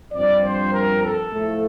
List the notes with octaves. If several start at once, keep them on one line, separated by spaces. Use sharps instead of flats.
G2 F3 C4 D5
C5
A#4
A4
A2 F3 A3